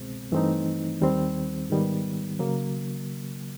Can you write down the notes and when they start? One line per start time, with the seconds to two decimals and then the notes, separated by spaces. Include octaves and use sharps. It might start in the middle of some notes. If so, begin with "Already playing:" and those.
Already playing: C2 B2 G#3 C4
0.32 G2 E3 A3 C4 D#4
1.01 D#2 D#3 G3 C4
1.70 G#2 D#3 G3 B3
2.39 C#3 F#3 A#3